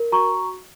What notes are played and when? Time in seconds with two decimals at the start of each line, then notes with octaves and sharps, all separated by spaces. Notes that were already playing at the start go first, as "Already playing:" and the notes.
Already playing: A#4
0.12 F#4 A#5 C#6